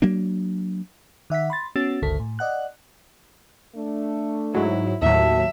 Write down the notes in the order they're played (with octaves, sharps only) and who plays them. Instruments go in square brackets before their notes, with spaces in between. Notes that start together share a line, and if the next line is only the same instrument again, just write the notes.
[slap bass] F#3 A#3 D4
[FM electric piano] D#3 E5 F#5 B6
B5 C6 A6
B3 C#4 F#4 E6 A6
G1 C#2 D3 A4 B6
A2
D5 D#5 F#5 F#6
[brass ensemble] A3 D4
[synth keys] G#2 F#3 [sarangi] E4
[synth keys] D#2 A2 F#3 [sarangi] E5 [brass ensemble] A5